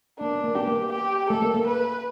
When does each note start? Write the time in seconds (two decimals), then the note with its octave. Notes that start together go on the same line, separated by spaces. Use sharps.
0.19 A#3 D4
0.31 B3
0.44 A#3
0.55 B3 G4
0.68 A#3
0.92 G4
1.30 A3 A4
1.42 A#3
1.55 A#3
1.67 B4